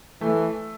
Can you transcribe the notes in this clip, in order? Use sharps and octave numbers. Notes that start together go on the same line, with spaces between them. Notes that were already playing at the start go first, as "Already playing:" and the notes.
E3 A3